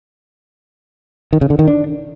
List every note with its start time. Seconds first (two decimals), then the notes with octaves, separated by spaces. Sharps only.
1.33 D#3
1.41 C#3
1.50 D3
1.59 D#3
1.68 D4